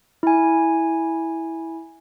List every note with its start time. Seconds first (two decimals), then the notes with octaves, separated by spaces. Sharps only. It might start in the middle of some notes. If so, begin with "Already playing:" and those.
0.23 E4 G#5